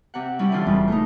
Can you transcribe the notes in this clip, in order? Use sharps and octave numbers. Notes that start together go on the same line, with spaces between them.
C3 F#5
G3 C#4 E4
D3 E3 F4
E1 C#3 G3
A3 A#3 D#4